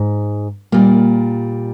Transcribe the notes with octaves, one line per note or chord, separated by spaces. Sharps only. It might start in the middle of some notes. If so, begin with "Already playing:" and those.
Already playing: G#2
A#2 G3 A#3